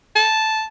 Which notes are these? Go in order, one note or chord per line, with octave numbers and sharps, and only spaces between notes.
A5